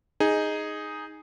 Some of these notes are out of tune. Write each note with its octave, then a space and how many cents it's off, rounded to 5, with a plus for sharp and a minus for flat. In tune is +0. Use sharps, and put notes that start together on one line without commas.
D#4 +0 G#4 +0